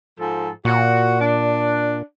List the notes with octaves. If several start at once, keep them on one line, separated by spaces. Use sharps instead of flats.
G#2 F3 A4
A#2 F#4
D4